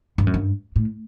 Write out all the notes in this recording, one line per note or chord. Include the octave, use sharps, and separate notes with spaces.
G2
F#2
G2
A2